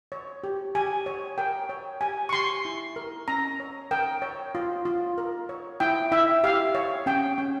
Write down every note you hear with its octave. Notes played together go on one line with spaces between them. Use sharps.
C#5
G4
G4 G#5
C#5
A#4 G5
C#5
G4 G#5
C#6
G4 C6
E4
A#4
C#4 A#5
C#5
A#4 G5
C#5
F4
F4
A#4
C#5
E4 G5
E4 E5
G4 F5
C#5
C#4 G5
C#4